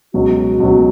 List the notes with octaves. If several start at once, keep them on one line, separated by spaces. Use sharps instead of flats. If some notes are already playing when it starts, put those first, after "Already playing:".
C#2 B2 F#3 F#4
C#2 B2 F#3